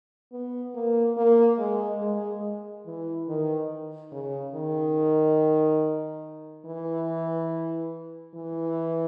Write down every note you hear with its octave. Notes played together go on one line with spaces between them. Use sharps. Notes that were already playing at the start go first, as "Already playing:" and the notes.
B3
A#3
A#3
G#3
G#3
E3
D#3
C#3
D#3
E3
E3